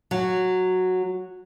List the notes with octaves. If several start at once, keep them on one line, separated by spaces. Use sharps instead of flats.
F#3